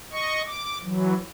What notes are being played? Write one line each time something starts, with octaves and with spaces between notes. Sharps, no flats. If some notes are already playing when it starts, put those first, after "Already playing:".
D#5 C#6
D6
E3 F#3